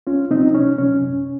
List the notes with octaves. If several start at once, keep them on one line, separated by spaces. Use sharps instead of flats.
C#2 C#4 F4
C3 F#3 C4 D#4
C#2 C#4
C3 F#3 C#4
F#2